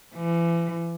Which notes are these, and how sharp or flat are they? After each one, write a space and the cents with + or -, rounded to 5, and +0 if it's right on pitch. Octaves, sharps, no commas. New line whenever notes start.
E3 +35